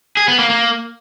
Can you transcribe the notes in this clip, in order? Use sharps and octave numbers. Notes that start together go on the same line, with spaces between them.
G#4
B3
A#3
A#3